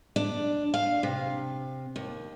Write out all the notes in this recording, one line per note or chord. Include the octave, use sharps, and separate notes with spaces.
D4
F5
C3
D#2